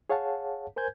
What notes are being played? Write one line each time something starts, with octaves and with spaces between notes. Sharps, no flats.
G#4 C#5 F5 F#5 A5
A#4 C5 G#5 G6 G#6